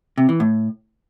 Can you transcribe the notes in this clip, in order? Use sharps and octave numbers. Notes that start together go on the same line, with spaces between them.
C3
E3
A2